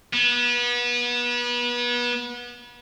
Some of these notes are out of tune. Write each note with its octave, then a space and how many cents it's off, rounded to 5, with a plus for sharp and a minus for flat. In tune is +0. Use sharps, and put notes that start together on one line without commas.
B3 -30